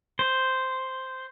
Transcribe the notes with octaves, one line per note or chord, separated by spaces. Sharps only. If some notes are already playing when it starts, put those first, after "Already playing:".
C5